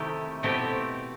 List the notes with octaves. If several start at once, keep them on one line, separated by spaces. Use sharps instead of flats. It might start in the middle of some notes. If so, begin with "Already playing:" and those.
Already playing: C3 D#3 A3 E4 G4
B2 A3 C4 E4 G4